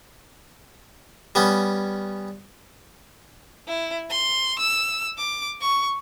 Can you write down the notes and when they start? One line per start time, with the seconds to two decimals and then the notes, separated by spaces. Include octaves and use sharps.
1.35 G3 B3 C#4
3.68 E4
4.10 C6
4.59 E6
5.18 D6
5.61 C#6